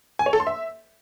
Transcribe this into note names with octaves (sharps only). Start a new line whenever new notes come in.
G#5
C#5
A4
C6
E5